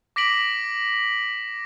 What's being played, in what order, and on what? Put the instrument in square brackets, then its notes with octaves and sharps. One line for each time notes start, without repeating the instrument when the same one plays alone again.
[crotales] D6 A#6 B6 D7 F#7